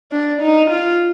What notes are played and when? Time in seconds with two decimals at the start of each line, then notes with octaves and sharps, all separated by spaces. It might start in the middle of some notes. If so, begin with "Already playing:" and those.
0.12 D4
0.42 D#4
0.71 F4